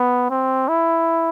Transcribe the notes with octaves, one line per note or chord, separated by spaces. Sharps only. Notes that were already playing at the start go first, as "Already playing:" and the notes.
Already playing: B3
C4
E4